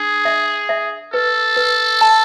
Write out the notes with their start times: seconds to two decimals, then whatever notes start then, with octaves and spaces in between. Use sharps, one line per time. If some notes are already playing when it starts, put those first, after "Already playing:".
Already playing: D4 G#4
0.25 E5
0.69 E5
1.13 A4 B4
1.57 B4
2.01 A5